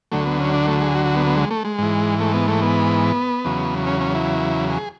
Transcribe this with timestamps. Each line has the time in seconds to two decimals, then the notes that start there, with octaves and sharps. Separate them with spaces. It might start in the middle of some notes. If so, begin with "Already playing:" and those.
0.12 D2 D3 F#3 A3
0.26 B3
0.40 C#4
0.54 D4
0.68 A3
0.82 G#4
0.95 F#4
1.06 F#4
1.16 B3
1.27 B3
1.37 G#3
1.51 A3
1.65 G#3
1.78 G#2 E3
2.20 A3
2.34 B3
2.48 A3
2.62 B3
3.45 E2 C#3 F#3
3.87 C#4
4.01 C#4
4.15 E4
4.70 G#4